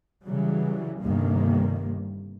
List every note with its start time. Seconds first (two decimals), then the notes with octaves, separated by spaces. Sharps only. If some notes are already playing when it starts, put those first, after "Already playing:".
0.24 C#3 E3 F#3 G3
1.01 G1 G2 C3 D#3 G3 A#3